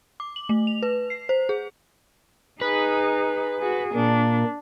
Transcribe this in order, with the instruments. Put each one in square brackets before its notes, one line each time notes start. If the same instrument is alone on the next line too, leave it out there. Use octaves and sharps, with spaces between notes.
[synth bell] D6
F#7
A3
F7
B4
C7
C5
G#4
[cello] D#4 G#4 [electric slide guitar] B4
[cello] F#4 G#4
[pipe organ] A#2 A#3 [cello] D4